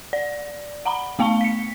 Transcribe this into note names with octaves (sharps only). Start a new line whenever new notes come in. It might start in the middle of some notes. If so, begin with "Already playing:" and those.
D5
F#5 A#5 B5
A3 B3 F5 A5 C#6 G7
B6 C#7